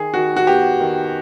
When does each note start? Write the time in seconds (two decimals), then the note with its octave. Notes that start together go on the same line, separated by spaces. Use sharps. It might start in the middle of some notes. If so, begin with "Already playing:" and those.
Already playing: D#3 G#4
0.14 D#3 F#4
0.36 F#4
0.47 B3 G4
0.80 D#3